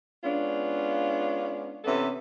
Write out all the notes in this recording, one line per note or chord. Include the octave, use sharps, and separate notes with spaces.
G#3 B3 C#4 D4 F4
C3 E3 B3 C#4 A4